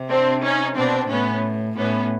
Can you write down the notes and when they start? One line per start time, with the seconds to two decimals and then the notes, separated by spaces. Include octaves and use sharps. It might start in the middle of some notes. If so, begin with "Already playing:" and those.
Already playing: C3
0.10 C4 D4
0.44 C#4 D#4
0.76 B2 C4 D4
1.09 A2 B3 C#4
1.77 A2 B3 C#4